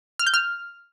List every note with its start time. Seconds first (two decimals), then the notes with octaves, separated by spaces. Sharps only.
0.19 F6
0.27 G6
0.34 F6